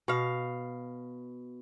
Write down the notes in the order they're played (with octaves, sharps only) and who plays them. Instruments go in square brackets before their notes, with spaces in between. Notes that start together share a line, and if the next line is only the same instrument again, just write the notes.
[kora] B2 F5